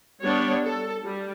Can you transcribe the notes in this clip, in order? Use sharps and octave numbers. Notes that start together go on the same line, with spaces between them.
G3 B3 D4 C#5
A4
G3